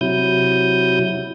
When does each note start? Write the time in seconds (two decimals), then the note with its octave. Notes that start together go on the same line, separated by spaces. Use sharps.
0.01 C3 F#3 E4 D#6 G6